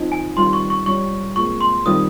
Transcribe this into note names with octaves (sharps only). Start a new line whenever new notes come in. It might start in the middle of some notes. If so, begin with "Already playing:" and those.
Already playing: F3 C4 D#4
G#5
D#3 G3 C4 F4 C6
C#6
C#6
G3 C#4 F4 C#6
A#2 G#3 C4 C#6
C6
D#3 G3 C4 F4 D#6